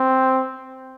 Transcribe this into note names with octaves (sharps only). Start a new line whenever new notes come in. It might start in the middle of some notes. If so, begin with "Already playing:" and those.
Already playing: C4